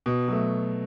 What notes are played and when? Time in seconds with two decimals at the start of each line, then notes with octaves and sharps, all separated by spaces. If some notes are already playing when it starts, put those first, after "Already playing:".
0.06 B2
0.28 F#3 A3